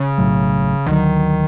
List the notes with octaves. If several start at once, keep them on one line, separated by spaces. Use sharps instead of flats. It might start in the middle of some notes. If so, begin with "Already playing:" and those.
Already playing: C#3
B1 A2 F#3
D2 D3 D#3 F#3